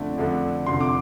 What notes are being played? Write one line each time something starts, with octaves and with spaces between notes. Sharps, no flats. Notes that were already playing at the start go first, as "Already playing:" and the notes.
Already playing: F2 D3 A3 D4 D5
F2 D3 A3 D4
F1 F2 D3 C6
D6